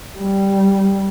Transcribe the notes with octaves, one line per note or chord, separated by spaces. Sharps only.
G3